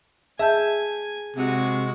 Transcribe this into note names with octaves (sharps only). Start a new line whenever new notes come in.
G#4 E5 G#5 A5 G6
C3 G#3 F#4